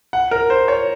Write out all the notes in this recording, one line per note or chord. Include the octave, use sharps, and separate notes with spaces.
F#5
A#4
C5
C#5